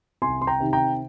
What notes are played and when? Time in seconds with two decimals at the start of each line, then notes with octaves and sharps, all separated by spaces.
0.22 C2 G#5 C6
0.42 C6
0.47 G5 A#5
0.60 C3 D#3
0.73 G5 A#5